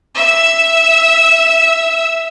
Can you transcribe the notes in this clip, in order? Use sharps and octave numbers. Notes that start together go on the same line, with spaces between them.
E5 E6